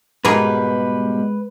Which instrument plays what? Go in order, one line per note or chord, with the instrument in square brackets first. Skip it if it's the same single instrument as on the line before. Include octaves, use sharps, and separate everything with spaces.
[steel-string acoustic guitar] G#2 B2 G3 [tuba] G#3 [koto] A#3 G#4 A#4 [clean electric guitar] B4